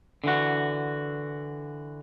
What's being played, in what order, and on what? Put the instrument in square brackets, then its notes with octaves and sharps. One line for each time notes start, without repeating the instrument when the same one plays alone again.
[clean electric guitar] D3 E3 F#4